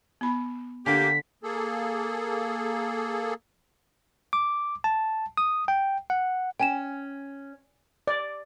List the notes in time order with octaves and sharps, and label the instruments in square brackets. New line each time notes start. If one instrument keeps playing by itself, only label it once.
[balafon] B3 B5
[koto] D3 [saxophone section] A#3 G4 [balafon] G#5 [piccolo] B6
[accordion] A#3 G#4 A4
[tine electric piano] D6
A5
D#6
G5
F#5
[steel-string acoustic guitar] C#4 [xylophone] G5 G#5 E7
[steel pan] D5